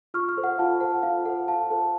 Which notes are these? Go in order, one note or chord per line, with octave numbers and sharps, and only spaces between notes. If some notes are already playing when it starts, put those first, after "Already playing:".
F4 C#6 F6
C#6 F6
A4 C5
F#5
F4 F5 A5
A4 C5 F#5
F4 F5
A4 C5 F#5
F4 F5 A5
A4 C5